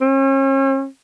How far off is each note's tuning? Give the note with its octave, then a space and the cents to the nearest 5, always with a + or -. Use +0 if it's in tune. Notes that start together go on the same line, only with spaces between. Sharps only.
C#4 -40